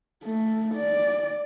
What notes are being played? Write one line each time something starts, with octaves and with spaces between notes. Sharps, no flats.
A3
D5